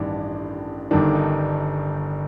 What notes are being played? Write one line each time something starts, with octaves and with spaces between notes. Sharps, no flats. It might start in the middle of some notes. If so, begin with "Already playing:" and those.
Already playing: A1 G2 D#3 D4
G1 G2 D#3 D4
D#4